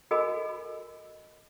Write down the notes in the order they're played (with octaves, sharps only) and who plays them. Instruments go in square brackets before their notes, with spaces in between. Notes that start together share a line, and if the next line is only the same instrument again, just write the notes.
[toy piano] F#4 A4 A#4 D#5 G#5 B5